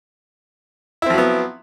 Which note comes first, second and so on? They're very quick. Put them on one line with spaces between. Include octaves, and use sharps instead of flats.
E4 C4 F3 F#3 B3